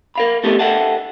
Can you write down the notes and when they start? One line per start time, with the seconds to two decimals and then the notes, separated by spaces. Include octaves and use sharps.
0.16 A#4 F5 B5
0.44 A3 B3 E4 G4 A4 B4
0.59 A4 D#5 E5 F#5 G5 A5